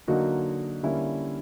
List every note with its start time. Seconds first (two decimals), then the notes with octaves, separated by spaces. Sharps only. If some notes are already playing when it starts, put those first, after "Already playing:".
0.08 D3 F#3 A#3 D#4 F#4
0.83 D3 G3 A#3 C#4 E4